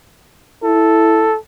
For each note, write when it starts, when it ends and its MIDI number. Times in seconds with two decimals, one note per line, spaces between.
0.63 1.31 64
0.63 1.37 69